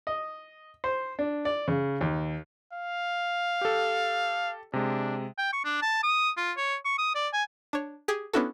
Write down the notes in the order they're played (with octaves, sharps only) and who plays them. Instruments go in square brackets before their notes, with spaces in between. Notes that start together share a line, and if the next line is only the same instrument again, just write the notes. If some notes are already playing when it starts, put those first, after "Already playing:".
[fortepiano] D#5
C5
D4
D5
C#3
D#2
[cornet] F5
[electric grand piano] G4 A4
[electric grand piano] C3 G#3 [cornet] D4
[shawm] G5
C#6
D4
A5
D#6
F4
C#5
C#6
D#6
D5
G#5
[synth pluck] D4 C#5
G4 G#4
B3 C#4 D4 E4 F#4 A4